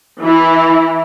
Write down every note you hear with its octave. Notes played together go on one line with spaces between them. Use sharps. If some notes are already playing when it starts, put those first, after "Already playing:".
E3 E4